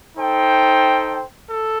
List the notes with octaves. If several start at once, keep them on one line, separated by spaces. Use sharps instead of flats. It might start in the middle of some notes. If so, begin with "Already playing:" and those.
D#4 A4 C5 G5
A4